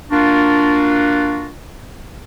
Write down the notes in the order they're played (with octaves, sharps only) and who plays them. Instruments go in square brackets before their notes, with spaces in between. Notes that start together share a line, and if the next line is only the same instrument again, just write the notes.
[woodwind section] A#3 D4 F4 F#4